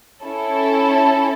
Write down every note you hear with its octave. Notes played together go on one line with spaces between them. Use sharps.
C#4 E4 A4